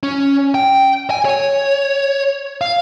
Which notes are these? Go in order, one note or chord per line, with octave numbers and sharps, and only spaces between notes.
C#4
G5
G#5
C#5
F5